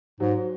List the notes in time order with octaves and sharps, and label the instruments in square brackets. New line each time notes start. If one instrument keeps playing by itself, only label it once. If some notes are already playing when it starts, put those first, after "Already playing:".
[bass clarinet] G#2 [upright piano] F#3